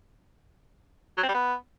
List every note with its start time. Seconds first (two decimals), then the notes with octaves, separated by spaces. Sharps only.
1.17 F#3
1.23 C4
1.29 G3
1.34 B3